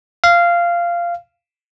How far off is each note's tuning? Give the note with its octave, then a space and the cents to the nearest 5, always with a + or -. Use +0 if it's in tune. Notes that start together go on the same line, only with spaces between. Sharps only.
F5 -15